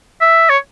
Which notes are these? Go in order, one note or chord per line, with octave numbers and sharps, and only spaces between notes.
E5
C#5